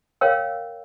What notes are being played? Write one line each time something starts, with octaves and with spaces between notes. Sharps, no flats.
A#4 C#5 F5 G5 E6